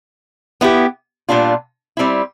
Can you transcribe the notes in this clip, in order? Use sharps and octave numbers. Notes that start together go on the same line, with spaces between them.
B3 E4 G4
A#2 G3 B3 D4 F4
G3 C4 E4